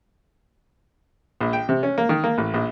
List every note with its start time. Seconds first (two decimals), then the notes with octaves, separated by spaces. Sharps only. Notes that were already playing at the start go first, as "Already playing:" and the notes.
1.41 A#1
1.53 G5
1.69 C3
1.83 C#4
1.98 A#3
2.09 D#3
2.24 A#3
2.38 A1
2.54 A#1